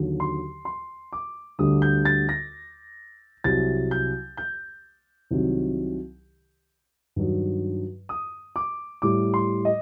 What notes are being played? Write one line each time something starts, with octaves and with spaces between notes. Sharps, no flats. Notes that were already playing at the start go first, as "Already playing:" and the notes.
Already playing: D#2 D3 F#3
C6
C6
D6
D2 D3 G3 D#6
G6
A6
A#6
C2 C3 F#3 A6
G6
G6
C2 C3 D#3 F#3
G2 D#3 F#3
D#6
D6
A2 G3 D6
C6
D#5